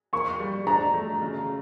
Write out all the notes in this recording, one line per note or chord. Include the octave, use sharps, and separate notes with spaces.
A#3 C#6
G3
D4 A#5
A3
C#3